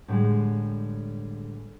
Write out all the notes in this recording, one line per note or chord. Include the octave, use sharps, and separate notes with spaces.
A2 D3 F3 G3 G#3